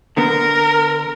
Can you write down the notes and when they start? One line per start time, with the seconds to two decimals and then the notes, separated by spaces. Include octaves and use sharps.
0.17 D3 B3 A#4